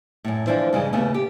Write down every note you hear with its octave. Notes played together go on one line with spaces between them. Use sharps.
F#2 A2
D3 E3 F3 D4 E4 C5
G2 C#3 E3 G#3
D#2 C#3 A3 B3
G4